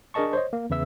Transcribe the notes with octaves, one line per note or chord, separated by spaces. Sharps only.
D4 G#4 A#4 D#5 A5 C#6
C5 C#5 D#5
A#3
E2 C#3 B4 E5 E6